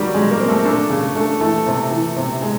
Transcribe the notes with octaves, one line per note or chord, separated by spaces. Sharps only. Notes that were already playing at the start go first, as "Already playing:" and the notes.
Already playing: D#3 F#3 G3 F#4 G4
G#3
A#3 A#4
C4
A3 A4
A3 D4 A4
C#3
A3 D4 A4
E3 A3 A4
C3
E3
C3
G#3